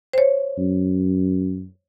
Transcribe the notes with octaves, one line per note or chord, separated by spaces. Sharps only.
C5 C#5
F#2